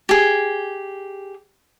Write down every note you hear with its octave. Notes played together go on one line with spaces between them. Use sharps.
G4 G#4